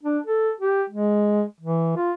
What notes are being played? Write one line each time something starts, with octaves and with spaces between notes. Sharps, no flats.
D4
A4
G4
G#3
E3
F4